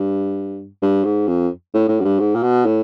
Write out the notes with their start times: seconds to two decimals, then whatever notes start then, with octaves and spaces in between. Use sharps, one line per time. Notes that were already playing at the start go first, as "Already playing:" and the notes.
Already playing: G2
0.82 G2
1.04 G#2
1.28 F2
1.74 A2
1.88 A2
2.00 F#2
2.05 G2
2.19 G#2
2.35 A#2
2.43 B2
2.66 A2